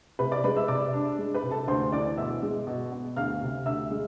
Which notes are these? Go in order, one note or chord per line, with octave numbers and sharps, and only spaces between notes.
C3 B4 B5
D5 D6
G#3 B4 B5
E5 E6
C3 D5 D6
D4
G#3
B4 B5
C3
A4 A5
D2 C5 C6
E3 D5 D6
B2 E5 E6
G#3
B2
B3
D2 F5 F6
C3
D2 E5 E6
G#3